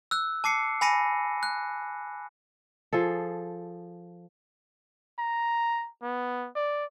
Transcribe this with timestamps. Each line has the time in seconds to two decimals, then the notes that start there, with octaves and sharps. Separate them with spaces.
0.11 E6 F#6
0.44 A5 D6 C7 C#7
0.81 G#5 B5 A#6 C#7 D#7
1.43 F#6
2.93 F3 G#4 A4
5.19 A#5
6.02 B3
6.55 D5